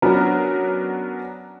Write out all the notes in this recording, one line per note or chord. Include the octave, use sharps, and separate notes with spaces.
F#3 B3 C#4 D4 F#4 A#4